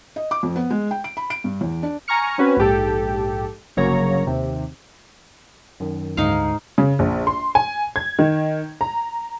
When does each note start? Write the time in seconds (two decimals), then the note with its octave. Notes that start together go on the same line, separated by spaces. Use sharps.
0.16 D#5
0.31 D6
0.43 F2
0.56 B3
0.70 G#3
0.91 G5
1.04 D7
1.17 B5
1.30 D7
1.44 G2
1.61 E2
1.83 D4
2.08 G#5 A#5 C#6 F6 C#7
2.38 C4 C#4 F#4 B4
2.57 A#1 G#2 G4 A4
3.77 G1 C#3 F#3 A#3 C#5 A#5
4.27 D#2 C3
5.80 F#2 D#3
6.17 D2 G#2 D#4 F5
6.78 C#3
6.99 A#1
7.27 C6
7.55 G#5
7.96 G#6
8.19 D#3
8.81 A#5